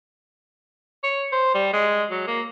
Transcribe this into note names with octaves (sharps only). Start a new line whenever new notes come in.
C#5
C5
G3
G#3
F#3
A#3